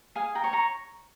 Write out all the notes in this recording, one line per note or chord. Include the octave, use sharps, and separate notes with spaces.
G#4 F5 G#5
G5 A#5
C#5
A#5 C#6